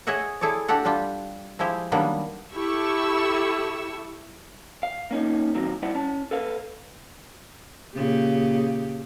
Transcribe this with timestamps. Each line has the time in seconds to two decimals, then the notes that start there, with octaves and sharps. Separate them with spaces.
0.07 G#4 C#5 D#5 E5 F#5
0.41 E4 G#4 A4 C#5 D5
0.68 D4 F#4 G4 A4 F#5
0.85 G3 D4 F4 G4
1.59 F3 G#3 E4 G4 C5
1.92 D#3 F#3 G3 A#3 B3 D4
2.53 E4 G4 A4 C#6 E6
4.83 F5
5.11 A#3 C#4 D#4
5.55 A#2 D#3 F#3 C4
5.82 G3 E4 C5 D5 F#5
5.95 C#4 A5
6.31 A4 B4 F5
7.95 A#2 C#3 G4